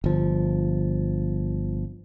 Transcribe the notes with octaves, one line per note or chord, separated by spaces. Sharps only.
G1 F3